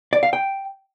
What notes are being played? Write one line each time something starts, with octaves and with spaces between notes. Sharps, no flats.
D5
F5
G5